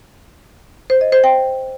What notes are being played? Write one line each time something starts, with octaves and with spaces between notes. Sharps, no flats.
C5
D#5
C5
G5